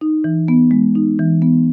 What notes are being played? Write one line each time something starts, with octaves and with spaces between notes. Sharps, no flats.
D#4
E3
B3
G#3
D#4
E3
B3